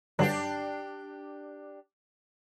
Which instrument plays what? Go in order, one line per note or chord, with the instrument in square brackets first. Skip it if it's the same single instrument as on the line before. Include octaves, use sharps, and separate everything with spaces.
[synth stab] G2 D3 F#3 [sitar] D4 G4